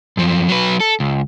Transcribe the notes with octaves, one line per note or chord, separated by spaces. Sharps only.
F#2 F3
F#3 B4
A4
C#2